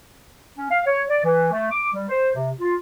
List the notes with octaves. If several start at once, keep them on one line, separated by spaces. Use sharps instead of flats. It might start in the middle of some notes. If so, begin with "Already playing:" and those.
C#4
F5
C#5
D5
E3
A3
D6
G3
C5
C3
F4